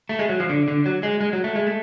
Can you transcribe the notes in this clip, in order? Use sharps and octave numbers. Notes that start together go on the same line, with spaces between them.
A3
G#3
F#3
F3
D3
D3
F#3
G#3
G#3
F#3
A3
G#3
A3